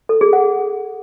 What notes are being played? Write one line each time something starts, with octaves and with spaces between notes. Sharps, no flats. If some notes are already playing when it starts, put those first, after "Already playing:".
A4
G#4
F#5